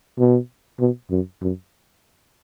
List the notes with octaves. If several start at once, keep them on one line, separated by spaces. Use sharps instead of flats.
B2
B2
F#2
F#2